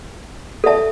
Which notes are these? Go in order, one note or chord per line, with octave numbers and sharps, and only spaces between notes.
A4 E5 A5